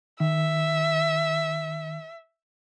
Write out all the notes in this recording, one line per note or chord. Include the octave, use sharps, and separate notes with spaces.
D#3 E5